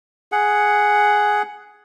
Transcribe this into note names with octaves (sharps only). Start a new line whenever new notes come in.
G#4 F#5